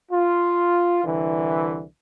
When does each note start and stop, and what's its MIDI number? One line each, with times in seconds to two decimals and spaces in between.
0.11 1.03 65
1.04 1.83 36
1.04 1.83 50
1.04 1.83 52